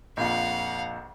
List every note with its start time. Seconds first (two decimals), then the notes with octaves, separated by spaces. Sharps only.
0.17 A#1 F2 F5 F#5